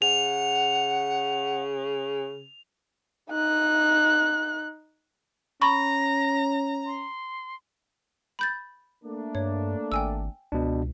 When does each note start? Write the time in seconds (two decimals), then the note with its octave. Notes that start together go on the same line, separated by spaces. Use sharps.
0.02 C#3 F#5 F7
3.30 D#4 F#6
5.62 C#4 A#5 B5 C#6 A#6
6.86 C6
8.39 B5 G6 A6
9.04 A3 A#3 D4
9.35 G2 C#5
9.92 G#1 G5 G#5 E6
10.52 C#2 B2 D4